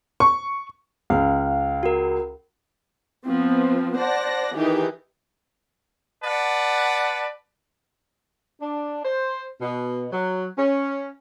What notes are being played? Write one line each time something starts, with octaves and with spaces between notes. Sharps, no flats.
C#6
C#2 F5
F#4 A#4
F3 B3 C4
C5 D5 F#5 A5 A#6
D#3 E3 D#4 G4 G#4
B4 D5 F#5 A5
D4
C5
B2
F#3
C#4